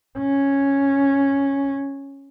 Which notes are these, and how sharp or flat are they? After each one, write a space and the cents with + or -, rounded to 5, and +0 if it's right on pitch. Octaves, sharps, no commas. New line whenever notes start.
C#4 -5